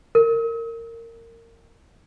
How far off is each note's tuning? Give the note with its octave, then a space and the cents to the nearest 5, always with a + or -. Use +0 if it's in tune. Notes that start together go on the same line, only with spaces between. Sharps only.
A#4 -20